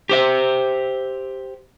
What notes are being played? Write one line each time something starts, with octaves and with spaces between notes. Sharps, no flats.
G4 C5 E5